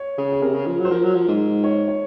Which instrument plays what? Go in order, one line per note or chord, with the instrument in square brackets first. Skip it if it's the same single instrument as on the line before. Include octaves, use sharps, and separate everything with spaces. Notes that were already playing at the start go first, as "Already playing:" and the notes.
Already playing: [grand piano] C#5
[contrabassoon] C#3
[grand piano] G#4
[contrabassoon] C3 [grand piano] A#4
[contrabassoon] C#3
F3
F#3
[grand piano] C5
[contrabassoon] F3 [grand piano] A#4
[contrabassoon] F#3
F3
G#2
[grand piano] C#5
C#5